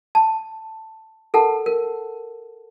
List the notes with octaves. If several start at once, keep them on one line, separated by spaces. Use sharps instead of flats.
A5
A4 A#4 F#5 A5
A#4